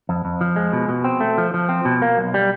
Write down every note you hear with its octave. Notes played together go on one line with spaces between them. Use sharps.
F2
F2
F3
G#3
B2
B2
C4
A3
F3
F3
C4
B2
A#3
B1
G3